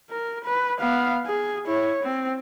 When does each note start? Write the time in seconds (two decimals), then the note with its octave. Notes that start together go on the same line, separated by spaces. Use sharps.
0.10 A#4
0.45 B4
0.80 B3 F5
1.26 G#4
1.67 E4 C#5
2.03 C4